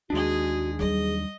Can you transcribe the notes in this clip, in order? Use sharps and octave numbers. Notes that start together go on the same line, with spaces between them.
D#2 G#3 D4 F#4 G#4
F#3 G3 G#4 D#5